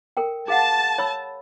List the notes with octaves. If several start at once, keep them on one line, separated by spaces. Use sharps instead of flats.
A4 A#4 G5
G#4 F5 F#5 A5
C#5 B5 E6